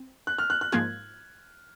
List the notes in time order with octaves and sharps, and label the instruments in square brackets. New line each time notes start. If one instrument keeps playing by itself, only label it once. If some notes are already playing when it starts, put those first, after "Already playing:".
Already playing: [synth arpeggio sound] C4
[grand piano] F#6
F6
F#6
F#6
[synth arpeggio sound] G#2 F3 A#3 F4 [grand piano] G#6